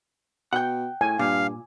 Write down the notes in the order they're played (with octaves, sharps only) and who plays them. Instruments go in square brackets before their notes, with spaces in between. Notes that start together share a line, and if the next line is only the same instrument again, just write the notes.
[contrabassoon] B2 [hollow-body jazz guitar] F#5 G5
[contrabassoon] A2 [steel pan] G#5
[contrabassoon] G2 [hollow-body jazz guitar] A#2 [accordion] F5